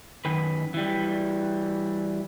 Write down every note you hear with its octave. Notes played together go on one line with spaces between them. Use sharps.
F#2 D#3 B4
E3 G3